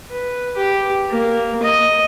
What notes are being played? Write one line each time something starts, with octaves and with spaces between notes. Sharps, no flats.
B4
G4
A#3
D#5